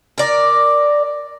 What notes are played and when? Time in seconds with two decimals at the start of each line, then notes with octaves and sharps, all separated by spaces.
0.18 A#4 D5